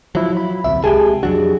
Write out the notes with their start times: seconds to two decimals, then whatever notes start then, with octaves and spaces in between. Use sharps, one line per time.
0.15 F3 F#3 E4 F4
0.37 B5
0.64 D#1 C2 E5
0.84 C2 G#3 G4 G#4 G#5 A5
1.23 F2 F#3 D4 F#4